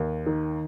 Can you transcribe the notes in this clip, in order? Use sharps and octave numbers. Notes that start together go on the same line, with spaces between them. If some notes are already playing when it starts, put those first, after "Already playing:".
Already playing: D#2
D#3